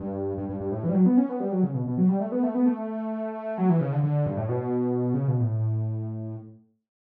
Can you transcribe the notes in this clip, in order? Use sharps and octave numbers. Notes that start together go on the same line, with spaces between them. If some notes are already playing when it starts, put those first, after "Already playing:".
Already playing: G2
G2
G2
G2
A2
E3
G3
F#3
B3
C#4
B3
G3
F#3
C#3
B2
B2
F#3
G3
A3
B3
A3
B3
A3
F#3
E3
C#3
D3
D3
G2
A2
B2
C#3
B2
A2